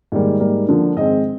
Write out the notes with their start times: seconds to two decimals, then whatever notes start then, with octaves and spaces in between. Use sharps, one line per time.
0.12 G#2 D#3 G3 A#3
0.40 G#2 G3 A#3
0.69 D3 F3 A#3
0.97 G#2 D#3 G#3 C4 D#5